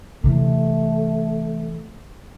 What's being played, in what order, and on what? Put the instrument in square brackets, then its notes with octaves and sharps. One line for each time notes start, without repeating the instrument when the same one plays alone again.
[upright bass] C3 E3 [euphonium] A3